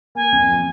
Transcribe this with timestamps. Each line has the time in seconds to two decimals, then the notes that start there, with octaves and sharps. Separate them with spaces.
0.15 A#3 G#5
0.32 F2
0.49 F3